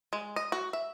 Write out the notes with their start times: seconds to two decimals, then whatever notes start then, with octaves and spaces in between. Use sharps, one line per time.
0.13 G#3
0.36 D#5
0.52 F#4
0.73 E5